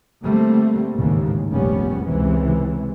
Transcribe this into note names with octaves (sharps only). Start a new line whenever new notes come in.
D3 G3 A3 A#3 C4
A1 D#2 G#2 C#3
F1 A#1 G3 B3 C#4
C#2 C3 E3